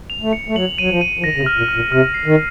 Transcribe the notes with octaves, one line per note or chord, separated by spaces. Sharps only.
F7
A3
C#7
A3
F#3 F#7
F#3 D#7
F3
D#7
F3
D#3 A#6
C#3
C3
F6
A#2
F6
A#2
C3 F6
C7
D#3